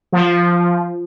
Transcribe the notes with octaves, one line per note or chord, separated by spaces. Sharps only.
F3